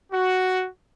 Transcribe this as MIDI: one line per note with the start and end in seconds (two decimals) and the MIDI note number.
0.12 0.66 66